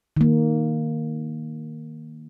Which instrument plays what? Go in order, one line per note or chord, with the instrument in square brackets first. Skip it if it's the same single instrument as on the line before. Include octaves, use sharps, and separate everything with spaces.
[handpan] D#3 A#3